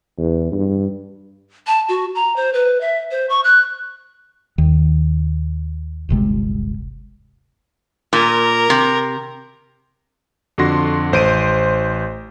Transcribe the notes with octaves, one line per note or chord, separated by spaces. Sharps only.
E2
G2
A5
F#4
A#5
C5
B4
E5
C5
C#6
F#6
D#2 D#3
D1 G1 C3 G#3
A#2 A#4
C3
F2 D3 F#4 C6 A#6
A1 C5 C6 D7 D#7